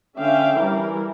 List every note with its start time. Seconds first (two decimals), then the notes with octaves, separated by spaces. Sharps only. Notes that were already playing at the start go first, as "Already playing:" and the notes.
0.17 D3 C#4 E5 F5 G5
0.58 E3 G3 E4 A#4